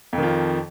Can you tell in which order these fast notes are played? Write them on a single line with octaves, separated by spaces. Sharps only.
F2 D#3 F3